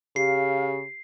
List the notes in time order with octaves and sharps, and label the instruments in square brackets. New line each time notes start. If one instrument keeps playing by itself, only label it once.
[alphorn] C#3 [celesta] G4 [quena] F5 [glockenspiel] C7